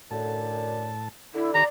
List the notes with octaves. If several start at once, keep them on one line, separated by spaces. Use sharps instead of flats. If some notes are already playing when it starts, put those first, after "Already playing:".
F#2 A2 D3 A5
D3 E4
D#3 G4 D5 A#5 B5